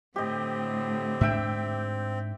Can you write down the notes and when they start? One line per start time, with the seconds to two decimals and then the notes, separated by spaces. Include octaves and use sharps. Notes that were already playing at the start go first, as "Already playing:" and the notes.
0.16 A2 D3 C4 G4 D#5
1.21 G#2 D4 E5 G5